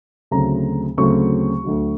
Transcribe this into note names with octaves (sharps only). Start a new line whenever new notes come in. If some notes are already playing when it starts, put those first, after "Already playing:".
D2 C#3 F#3 A3 C4 A#5
D2 C#3 F#3 A3 C4 C#6
D2 D3 F#3